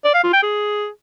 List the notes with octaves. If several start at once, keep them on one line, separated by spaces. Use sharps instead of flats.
D5
F5
F4
G5
G#4